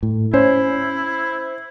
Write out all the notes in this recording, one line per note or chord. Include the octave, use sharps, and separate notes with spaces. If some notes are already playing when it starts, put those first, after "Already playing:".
A2
C#4 E4 C5